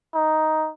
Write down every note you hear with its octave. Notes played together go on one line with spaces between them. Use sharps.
D#4